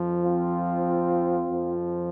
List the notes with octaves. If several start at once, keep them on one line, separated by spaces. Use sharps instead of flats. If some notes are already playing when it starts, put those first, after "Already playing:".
Already playing: F2 F3
C4 F4
F2 F3